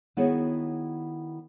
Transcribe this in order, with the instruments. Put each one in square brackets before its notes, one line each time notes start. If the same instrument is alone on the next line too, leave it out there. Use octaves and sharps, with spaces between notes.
[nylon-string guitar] D#3 B3 E4 F#4 G#4 C#5